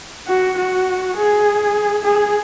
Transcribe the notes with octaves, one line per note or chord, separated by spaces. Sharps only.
F#4
F#4
G#4
G#4